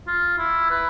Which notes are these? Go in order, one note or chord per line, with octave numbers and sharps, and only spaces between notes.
F4
E4
B4